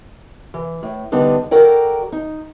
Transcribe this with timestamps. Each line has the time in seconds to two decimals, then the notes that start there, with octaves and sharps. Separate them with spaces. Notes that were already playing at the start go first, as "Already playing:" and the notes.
0.54 E3
0.83 A2
1.12 D3 G3 B3 D4 D#4
1.51 F#4 A4 A#4 D5 G5
2.12 D#4